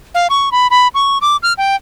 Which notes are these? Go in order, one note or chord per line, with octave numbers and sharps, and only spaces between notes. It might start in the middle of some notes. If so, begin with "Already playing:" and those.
F5
C#6
B5
B5
C#6
D6
F6
G5